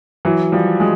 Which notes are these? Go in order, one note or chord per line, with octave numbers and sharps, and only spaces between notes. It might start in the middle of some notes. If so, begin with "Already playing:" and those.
E3 F#3
F3 G3
F#3 G#3